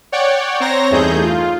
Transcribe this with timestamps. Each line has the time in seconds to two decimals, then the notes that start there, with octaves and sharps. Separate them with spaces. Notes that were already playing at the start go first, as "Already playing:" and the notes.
0.12 C#5 D5 F#5 G5
0.60 C4 C5 C#5 A#5 A#6
0.90 E2 G2 A3 D#4 G#4 G6
1.23 F4